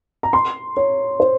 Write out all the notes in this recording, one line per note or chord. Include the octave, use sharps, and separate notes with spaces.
A#5
C6
C#5
C5